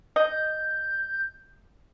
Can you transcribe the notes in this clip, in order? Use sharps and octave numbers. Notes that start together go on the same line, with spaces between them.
D#5 G6